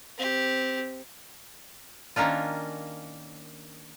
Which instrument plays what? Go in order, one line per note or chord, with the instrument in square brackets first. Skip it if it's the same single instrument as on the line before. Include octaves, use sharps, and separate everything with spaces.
[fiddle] C4 G4
[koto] D#3 A#3 C#4 D4 F4